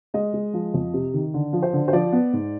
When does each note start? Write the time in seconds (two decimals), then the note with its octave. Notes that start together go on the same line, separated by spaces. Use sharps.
0.14 G#3 D#5
0.33 G#3
0.53 F3
0.74 F2
0.93 C3
1.14 D#3
1.34 D3
1.53 F3
1.63 C5
1.73 D3
1.88 C5
1.93 F3 D5
2.13 B3
2.33 G#2